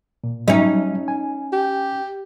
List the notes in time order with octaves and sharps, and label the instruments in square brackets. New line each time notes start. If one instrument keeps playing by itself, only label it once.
[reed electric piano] A#2
[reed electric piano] F#3 G3 E5 [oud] C#4 D#4
[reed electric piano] G#5
[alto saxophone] G4